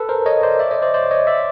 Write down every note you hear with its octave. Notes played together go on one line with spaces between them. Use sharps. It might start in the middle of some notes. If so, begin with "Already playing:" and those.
Already playing: A4 B4
A#4 C5
C#5 D#5
C5 D5
D5 E5
C#5 D#5
C5 D5
C5 D5
C#5 D#5
D5 E5